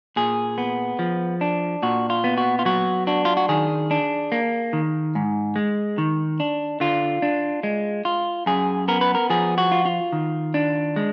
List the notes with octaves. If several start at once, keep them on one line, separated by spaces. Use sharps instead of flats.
A#2 G#4
B3
F3
D4
A#2 F#4
F4
B3
F#4
F4
F#3 F#4
D4 F#4
F4
F#4
D#3 G#4
D4
A#3
D#3
G#2
G#3
D#3
D4
D3 F4
D4
G#3
F4
F#2 G#4
B3 A#4
B4
A#4
F3 G#4
F#4
F4
F4
D#3
D4
G#3